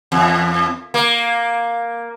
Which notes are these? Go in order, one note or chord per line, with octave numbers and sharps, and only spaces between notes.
E2
A#3